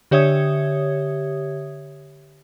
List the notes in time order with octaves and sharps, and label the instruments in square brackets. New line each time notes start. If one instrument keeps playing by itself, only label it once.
[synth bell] D3 G4 C#5 E5 D#6 G#6